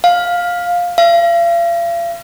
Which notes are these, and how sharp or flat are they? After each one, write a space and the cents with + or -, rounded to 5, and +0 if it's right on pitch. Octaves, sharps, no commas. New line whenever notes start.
F5 +10
F5 -40